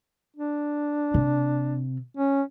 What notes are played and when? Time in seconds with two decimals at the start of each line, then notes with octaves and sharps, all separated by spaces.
0.36 D4
1.14 C3
2.17 C#4